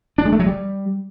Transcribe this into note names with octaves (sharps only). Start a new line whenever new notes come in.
D4
G#3
A3
F#3
G3